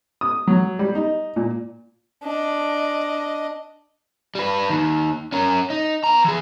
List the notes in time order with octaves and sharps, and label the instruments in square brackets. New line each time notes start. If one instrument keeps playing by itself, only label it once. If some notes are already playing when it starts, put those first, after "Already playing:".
[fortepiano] D#6
F#3
G3
D#4
A#2
[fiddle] D4 D#5
[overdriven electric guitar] G3 B4
D#2 D#3
C#4 A#4
D#4
B3 A#5
E3 G#4